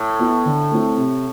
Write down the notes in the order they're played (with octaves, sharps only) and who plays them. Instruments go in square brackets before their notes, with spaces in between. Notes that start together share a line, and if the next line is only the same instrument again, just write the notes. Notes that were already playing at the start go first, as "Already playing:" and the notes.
Already playing: [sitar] A2
[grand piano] B3 E4
D3
A3 C4 E4
C3